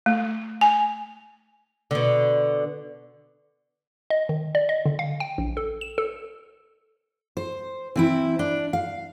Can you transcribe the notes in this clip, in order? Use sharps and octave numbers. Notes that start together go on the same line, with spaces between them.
A3
G#5
B2 D3
D#5
D#3
D5
D#5
D3
F5
G5
A#1
A4
E7
A4
C5
E3 C4 E4
D4
F5